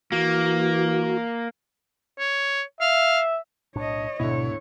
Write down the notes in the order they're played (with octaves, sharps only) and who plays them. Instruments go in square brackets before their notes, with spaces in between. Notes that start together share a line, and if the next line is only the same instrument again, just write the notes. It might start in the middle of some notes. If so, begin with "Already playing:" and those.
[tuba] E3 [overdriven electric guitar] A#3 [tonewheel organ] F#4
[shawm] C#5
[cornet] E5 [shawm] F5
[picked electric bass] B1 A2 D4 [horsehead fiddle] C#5 D#5
[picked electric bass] D2 G#2 B3 [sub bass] B2 [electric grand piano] D3 E4 [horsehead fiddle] C#5